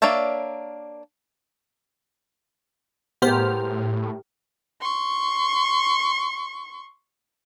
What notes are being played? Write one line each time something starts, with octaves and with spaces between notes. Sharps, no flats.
A#3 D4 C#5 D5 E5
A2 B3 G4 G#4 A#4 C5 F6
C6 C#6